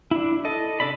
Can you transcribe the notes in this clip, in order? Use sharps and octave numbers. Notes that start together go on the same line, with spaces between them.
D4 E4
A4 D#5
C#3 D4 A4 D5 B5